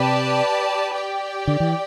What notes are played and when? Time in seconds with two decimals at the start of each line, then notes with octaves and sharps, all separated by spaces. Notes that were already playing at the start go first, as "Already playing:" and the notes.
Already playing: C3 G4 B4 D5 A5
0.93 G4 D5 G5
1.47 D3
1.60 E3